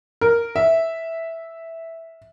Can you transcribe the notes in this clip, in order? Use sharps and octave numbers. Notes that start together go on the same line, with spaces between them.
A#4
E5